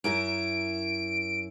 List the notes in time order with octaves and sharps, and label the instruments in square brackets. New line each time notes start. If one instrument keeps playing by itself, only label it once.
[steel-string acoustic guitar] F#2 E4 A#4 [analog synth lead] D7